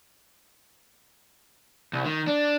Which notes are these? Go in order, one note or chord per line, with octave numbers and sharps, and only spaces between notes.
C2
D#3
D4